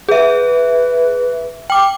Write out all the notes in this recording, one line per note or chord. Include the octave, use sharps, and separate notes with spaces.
G#4 B4 E5
G5 D6